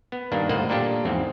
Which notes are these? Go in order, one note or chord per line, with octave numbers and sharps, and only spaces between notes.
B3
G2 D#3 A#3 D4
G1 A2 A#3 C5 D#5 F#5
A#2 A#3 D4 G4 A4
E2 G#2 F3 C4